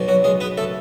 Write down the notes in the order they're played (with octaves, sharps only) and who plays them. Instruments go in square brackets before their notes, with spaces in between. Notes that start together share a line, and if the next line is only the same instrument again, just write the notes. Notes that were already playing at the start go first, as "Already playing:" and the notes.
Already playing: [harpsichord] B1 B2
F#3 F#4
G#3 G#4
B3 B4
A3 A4